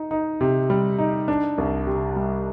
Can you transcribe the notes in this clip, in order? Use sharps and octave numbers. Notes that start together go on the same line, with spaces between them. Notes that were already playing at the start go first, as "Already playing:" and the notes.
Already playing: D#4
D#4
C3
G3
D#4
D4
C2
C3
G3